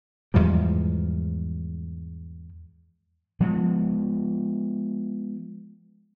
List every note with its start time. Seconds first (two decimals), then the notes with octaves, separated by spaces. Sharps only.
0.34 E2 G#2 F3 G3
3.40 F3 G#3 B3